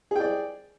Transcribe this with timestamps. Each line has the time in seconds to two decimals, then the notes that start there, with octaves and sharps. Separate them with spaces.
0.11 G#4
0.16 G5
0.20 D5